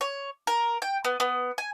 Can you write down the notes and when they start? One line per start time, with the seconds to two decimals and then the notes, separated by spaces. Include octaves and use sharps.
0.01 C#5
0.47 A#4
0.82 G5
1.05 B3
1.20 B3
1.58 G#5